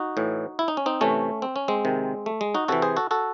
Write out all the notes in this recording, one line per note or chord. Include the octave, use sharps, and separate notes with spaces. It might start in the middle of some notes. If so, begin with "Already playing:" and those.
Already playing: D#4 F#4
A2 E3
E4
D#4
C#4
C4 D#4
C3 E3 A3 C#4
C4
C#4
G#3 C4
C3 D#3
A3
G#3
D#4 F#4
C3 E3 F#4 A4
G#4 C5
F#4 A4
F#4 A4